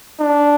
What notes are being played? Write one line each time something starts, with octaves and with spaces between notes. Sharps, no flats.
D4